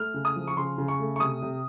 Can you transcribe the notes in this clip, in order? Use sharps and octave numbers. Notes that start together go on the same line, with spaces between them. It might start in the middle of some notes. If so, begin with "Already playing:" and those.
Already playing: A3 F6
C#3
D#6
F3
C#6
C#3 C6
C#3
C#6
A3
C#6
C3 D#6
C3